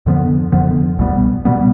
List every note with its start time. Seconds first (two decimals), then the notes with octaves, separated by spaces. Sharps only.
0.06 F2 D3 F3 B3
0.52 F2 D3 F3 B3
0.99 C2 B2 G3 B3
1.45 B2 G3 B3